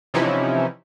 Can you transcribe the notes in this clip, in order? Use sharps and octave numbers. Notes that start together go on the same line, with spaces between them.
C3 E3 F3 C#4 D#4 E4